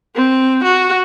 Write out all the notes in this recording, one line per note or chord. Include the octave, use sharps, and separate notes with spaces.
C4
F#4